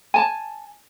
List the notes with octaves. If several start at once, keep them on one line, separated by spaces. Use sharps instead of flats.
G#5 A5